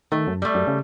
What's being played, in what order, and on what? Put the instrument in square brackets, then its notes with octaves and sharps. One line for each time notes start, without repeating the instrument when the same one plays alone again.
[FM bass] D#3 [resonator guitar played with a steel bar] A3
[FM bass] F#2
[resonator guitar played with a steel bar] G3 A3
[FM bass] F#2
C#3